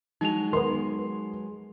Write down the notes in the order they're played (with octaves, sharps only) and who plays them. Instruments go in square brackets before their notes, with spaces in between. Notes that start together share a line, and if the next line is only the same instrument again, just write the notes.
[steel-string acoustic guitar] F#3 G#3 G#4 [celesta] D#4 F7
[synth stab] D#3 B3 [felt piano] C6